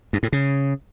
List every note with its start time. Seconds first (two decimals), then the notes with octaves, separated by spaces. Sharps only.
0.13 G2
0.23 A2
0.33 C#3